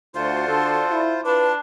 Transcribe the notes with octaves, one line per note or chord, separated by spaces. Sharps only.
D2 F4 F#4 C5 D5 C6
D3 A4
E4
D4 F4 B4 A5